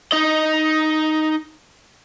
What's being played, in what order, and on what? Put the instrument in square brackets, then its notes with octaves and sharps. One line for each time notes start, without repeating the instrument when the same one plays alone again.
[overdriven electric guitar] D#4 D#5